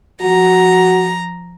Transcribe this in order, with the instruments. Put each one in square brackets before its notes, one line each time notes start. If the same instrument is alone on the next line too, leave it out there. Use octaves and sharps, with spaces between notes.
[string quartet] F3 A#5 [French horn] F#4